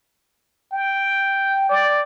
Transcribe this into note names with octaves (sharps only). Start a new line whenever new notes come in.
G5
D5